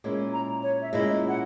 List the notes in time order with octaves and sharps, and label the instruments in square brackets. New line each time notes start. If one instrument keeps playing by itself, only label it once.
[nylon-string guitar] A#2 G#3 C#4 E4
[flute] A#5
C#5
E5
[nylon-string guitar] A#2 G#3 C#4 E4 [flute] D#5
[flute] F#5